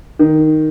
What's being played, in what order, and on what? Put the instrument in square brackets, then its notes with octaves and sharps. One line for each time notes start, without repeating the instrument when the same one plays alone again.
[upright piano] D#3